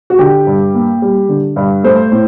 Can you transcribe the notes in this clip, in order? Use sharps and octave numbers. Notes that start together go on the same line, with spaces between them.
F#4
D3 G4
G2
A#3
G3
D3
G2
A3 C5
A2